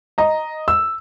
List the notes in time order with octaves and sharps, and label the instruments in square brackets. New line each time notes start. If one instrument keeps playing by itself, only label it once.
[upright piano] D#5 A#5
E6